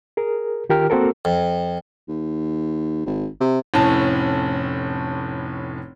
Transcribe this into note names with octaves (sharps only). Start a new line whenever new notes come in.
G#4 A#4
D#3 F4 G4 A#4 G5 F6
A#3 C4 F#4 A4 A#4
F2
D#2
G#1
C3
F1 A2 C#4 A5